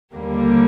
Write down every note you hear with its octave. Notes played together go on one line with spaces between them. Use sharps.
D#2 D3 G3 A#3